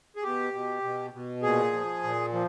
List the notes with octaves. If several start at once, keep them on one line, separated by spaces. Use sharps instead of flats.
G#4
B2 G4
B2
B2
B2
A#2 G#4
F3
A#2
F3